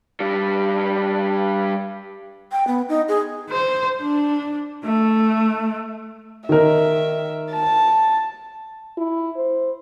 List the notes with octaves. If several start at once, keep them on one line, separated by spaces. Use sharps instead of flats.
G3 D4
G5
B3
D#4
G#4
C5
D4
A3
D#3 A#4 E5
A5
E4
C5